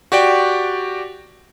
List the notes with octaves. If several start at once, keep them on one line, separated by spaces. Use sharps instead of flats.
F#4 G4 D5 G5